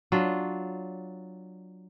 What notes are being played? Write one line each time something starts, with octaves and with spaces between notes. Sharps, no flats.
F#3 D4 F4